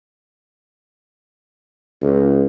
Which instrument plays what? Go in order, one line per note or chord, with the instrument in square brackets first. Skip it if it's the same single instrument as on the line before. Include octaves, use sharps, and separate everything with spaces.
[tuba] C#2